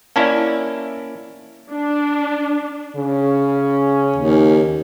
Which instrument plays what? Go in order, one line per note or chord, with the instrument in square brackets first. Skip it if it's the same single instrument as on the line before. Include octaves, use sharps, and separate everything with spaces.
[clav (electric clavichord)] A#3 C#4 E4 [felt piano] D5 E5 A5
[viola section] D4
[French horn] C#3 [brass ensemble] C#4
[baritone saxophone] D#2